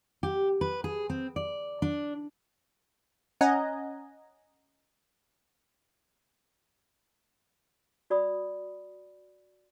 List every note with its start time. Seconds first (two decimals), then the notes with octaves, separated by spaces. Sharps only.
0.23 G4
0.61 B4
0.84 G#4
1.10 C4
1.36 D5
1.82 D4
3.41 C#4 D#5 F#5 G#5 A#5
8.10 F#4 D5 B5 D#6